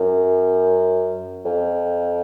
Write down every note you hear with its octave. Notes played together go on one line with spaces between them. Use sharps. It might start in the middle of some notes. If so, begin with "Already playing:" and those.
Already playing: F#2
F2